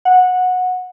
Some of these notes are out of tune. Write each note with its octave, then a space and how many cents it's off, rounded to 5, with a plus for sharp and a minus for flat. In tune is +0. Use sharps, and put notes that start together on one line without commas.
F#5 -15